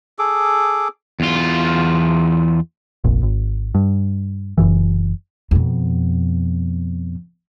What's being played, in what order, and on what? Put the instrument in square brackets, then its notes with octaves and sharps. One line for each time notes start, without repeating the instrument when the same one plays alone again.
[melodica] G#4 A4 D6
[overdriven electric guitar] E2 F4
[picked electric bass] F1 A#1
G#1
G2
F#1 C2 F#2 E3
[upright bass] F2 B2